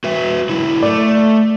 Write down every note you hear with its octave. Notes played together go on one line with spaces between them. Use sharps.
F#4 B4 E5
F#3 E4
A3 D5